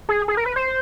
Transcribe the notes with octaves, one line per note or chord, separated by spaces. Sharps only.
G#4
G#4
A#4
B4
C5